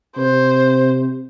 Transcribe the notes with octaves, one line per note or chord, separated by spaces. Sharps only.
C3 C5